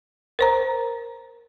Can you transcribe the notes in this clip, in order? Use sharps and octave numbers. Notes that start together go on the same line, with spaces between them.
A#4 C5 A#5